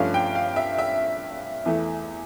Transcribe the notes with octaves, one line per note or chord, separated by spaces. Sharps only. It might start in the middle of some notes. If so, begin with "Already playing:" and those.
Already playing: G2 F3 A3 C#4 F5
G5
F5
E5
E5
E2 E3 A3